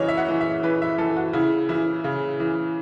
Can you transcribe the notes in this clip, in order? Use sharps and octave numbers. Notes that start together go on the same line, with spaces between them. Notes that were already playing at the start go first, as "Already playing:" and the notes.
Already playing: C#3 E3 C#5 D#5
E5
F#5
E3
E5
E3 B4
E5
E3 A4
F#4
C#3 E4
E3 E4
C#3
E3